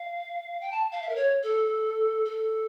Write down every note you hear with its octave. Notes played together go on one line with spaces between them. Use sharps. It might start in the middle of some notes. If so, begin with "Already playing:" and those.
Already playing: F5
G5
A5
F5
E5
A#4
C#5
A4
A4